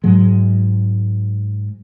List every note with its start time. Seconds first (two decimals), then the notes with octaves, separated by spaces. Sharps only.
0.04 G#2 F#3 G#3